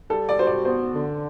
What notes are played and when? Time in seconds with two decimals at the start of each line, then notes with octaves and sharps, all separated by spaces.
0.10 G3 A4
0.29 D5
0.38 F#4 C5
0.47 D5
0.65 B3 C5
0.92 D3